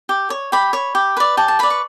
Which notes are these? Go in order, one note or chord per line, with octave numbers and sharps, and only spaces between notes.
G4
C#5
G4 B5
C#5
G4
B4 D5
G4 A5
A5
B4 D5 B5
C#6